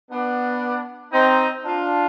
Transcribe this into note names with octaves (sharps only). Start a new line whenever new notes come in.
B3 D4
C4 D#4
D4 F4